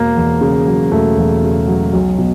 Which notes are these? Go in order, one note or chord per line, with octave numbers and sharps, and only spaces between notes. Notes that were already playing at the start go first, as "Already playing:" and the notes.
Already playing: E1 A#3
E2
C#3
F#3
E1 A3
E2
C#3
F#3
B1
B2